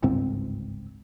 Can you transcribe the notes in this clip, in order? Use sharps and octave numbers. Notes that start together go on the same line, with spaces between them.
G1 C#2 G#2 C4